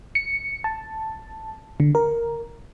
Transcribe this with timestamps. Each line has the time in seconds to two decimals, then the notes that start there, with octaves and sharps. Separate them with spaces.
0.15 C#7
0.64 A5
1.80 D3
1.95 A#4